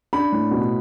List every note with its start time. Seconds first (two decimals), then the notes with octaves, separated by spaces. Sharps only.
0.13 D4 B5
0.32 A2
0.51 B2